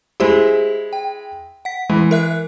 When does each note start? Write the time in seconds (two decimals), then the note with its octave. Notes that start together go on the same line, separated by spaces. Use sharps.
0.20 G#3 E4 G4 G#4 C5
0.93 G5
1.65 F#5 B6
1.90 E3 G#3
2.11 A#4 E5 F#6